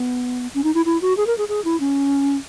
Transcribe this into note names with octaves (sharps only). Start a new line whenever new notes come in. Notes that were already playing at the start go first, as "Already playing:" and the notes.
Already playing: B3
C#4
D#4
E4
E4
F#4
G#4
A#4
G#4
G#4
E4
C#4